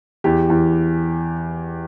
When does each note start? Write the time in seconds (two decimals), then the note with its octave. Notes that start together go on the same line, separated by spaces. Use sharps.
0.24 E2 G4
0.50 E2